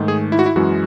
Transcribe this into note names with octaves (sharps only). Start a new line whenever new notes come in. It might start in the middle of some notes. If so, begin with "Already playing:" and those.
Already playing: G#2 D#3 A3
G#4
E4
F#4
E4
F#2 E3 G#3 F#4